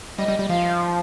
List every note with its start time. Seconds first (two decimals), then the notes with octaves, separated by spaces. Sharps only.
0.18 G3 D#5
0.28 G3
0.39 G3
0.49 F3 F5